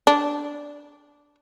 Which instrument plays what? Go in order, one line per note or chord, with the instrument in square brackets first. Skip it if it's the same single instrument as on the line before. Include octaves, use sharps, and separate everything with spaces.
[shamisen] D4